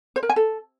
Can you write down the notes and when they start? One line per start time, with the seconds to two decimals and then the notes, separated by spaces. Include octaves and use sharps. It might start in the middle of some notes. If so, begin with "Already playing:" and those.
0.16 C5
0.23 A#4
0.29 G#5
0.36 A4